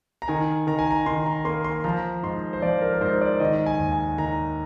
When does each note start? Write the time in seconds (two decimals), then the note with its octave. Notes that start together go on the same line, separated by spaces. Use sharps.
0.22 A#5
0.28 D#3 G#5
0.67 D#3 A#5
0.79 G#5
0.91 A#5
1.06 D#3 C6
1.26 A#5
1.45 A#3 C6
1.64 C6
1.84 F3 A#5
2.23 G#2 C6
2.53 C5
2.62 F3 D5
2.81 A#4
2.94 A#4
3.01 G#2 C5
3.21 D5
3.40 D#3 D#5
3.66 G#5
3.79 D#2
3.92 G#5
4.18 D#3 A#5